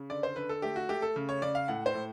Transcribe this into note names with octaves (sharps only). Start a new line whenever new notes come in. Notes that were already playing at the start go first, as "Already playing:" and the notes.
Already playing: C#3
D3 D5
C5
D3 B4
A4
A3 G4
F#4
A3 G4
A4
C#3
C#5
C#3 D5
F5
A2 F#5
C5
A2